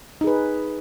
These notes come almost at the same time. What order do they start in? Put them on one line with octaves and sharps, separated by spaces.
D#4 G#4 B4